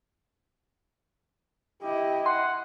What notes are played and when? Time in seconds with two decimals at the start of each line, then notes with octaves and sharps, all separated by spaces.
1.82 E4 G4 D#5
2.26 F#5 C6